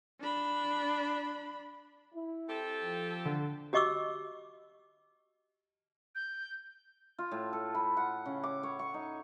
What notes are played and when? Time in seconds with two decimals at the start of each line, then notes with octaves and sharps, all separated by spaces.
0.20 D4 B5
2.14 E4
2.49 C4 G4 A4
2.83 F3
3.25 D3
3.73 F#4 G4 D#5 C#6 D6 E6
6.15 G6
7.19 F4
7.31 A2
7.53 A4
7.75 B5
7.97 F#5
8.26 C#3
8.44 D6
8.63 C#5
8.79 C#6
8.94 D#4